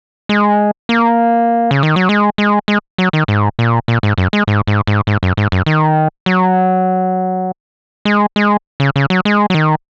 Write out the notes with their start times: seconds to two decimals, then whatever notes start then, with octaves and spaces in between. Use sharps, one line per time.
0.29 G#3
0.89 A#3
1.71 C#3
1.83 D#3
1.96 F#3
2.09 G#3
2.38 G#3
2.68 G#3
2.98 F#3
3.13 D#3
3.28 G#2
3.59 A#2
3.88 A#2
4.03 G#2
4.18 F#2
4.33 G#3
4.47 G#2
4.67 G#2
4.87 G#2
5.07 G#2
5.23 F#2
5.37 G#2
5.52 F#2
5.66 D#3
6.26 F#3
8.05 G#3
8.36 G#3
8.80 C#3
8.96 C#3
9.10 F#3
9.25 G#3
9.50 F#3
9.55 D#3